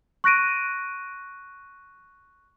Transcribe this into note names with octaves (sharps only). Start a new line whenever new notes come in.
C#6 F#6 A#6 D7 D#7